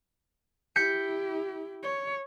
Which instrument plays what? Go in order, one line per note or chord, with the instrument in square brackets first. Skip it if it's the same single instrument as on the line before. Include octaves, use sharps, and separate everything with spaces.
[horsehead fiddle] E4 G4 [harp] G6 B6 C#7
[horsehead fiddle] C#5